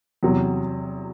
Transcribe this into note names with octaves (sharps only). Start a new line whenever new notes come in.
E2 C3 F#3